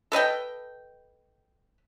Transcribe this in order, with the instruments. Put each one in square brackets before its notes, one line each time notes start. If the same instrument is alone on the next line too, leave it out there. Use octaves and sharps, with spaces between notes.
[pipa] A4 B4 D#5 G5